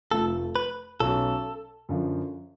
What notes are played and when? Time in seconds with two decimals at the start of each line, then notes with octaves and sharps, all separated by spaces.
0.11 F1 F2 F3 A3 F4 A4
0.56 B4
1.00 B1 B2 F#3 C#4 A4
1.89 F#2 D3 F3